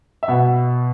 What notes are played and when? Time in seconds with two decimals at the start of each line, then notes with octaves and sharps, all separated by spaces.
0.23 E5
0.28 B2 F#5